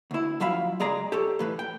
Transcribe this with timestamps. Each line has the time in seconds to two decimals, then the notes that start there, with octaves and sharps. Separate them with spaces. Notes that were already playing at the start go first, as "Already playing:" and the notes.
0.11 D2 E4
0.40 F#2 F3 F#3 E5 F5 B5
0.80 C#2 G#3 G#4 D5 A#5
1.12 G4 A4 C#5
1.39 A2 E3 B4
1.59 G5